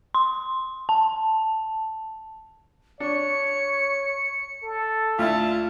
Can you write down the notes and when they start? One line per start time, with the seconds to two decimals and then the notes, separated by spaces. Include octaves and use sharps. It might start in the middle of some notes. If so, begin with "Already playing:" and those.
0.15 C6
0.89 A5
3.00 D4 C#5 C#7
4.63 A4
5.19 D2 E4 F4 A5